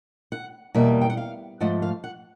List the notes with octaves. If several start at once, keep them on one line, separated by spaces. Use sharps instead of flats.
F#5
E2 B2 G3 A#3 E5
G5
F#5
F5
G#2 F3 A3 F#5
F5
F#5